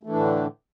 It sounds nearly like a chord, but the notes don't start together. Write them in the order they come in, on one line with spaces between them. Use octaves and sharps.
A3 E3 D4 A2 D3